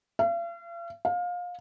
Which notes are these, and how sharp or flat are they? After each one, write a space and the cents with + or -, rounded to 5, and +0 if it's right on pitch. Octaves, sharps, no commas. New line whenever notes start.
F5 -45
F5 +25